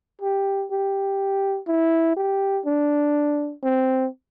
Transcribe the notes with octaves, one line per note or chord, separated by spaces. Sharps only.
G4
G4
E4
G4
D4
C4